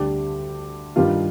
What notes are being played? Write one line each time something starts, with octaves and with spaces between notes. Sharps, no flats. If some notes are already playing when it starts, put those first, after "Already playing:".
Already playing: D2 D3 G3 D4 G4
G2 D#3 G3 D4 F4